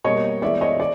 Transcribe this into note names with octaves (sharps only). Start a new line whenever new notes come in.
B2 G3 A#3 C#5 D#5
E3 G#3 B3 D5 E5
C#5 D#5
D5